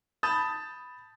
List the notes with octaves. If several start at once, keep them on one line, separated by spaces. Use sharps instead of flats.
A5 B5 D#6 G6 A6